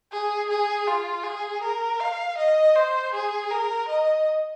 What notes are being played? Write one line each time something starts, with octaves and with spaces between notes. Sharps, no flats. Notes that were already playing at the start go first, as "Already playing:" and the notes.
G#4
G#4
F4
G#4
A#4
F5
D#5
C5
G#4
A#4
D#5